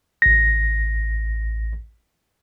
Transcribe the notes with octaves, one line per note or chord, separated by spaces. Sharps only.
A1 A#6